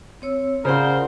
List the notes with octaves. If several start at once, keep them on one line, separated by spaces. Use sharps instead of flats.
C4 C#5 E6
C#3 F4 A#4 C5 D5 F#5